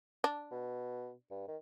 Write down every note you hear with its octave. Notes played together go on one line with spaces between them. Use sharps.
D4
B2
G2
D#3